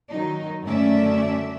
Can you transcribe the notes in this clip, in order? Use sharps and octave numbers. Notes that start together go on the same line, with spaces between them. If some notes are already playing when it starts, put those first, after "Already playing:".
D#3 F#3 D#4
F#2 D3 A3 C#4 D5 E5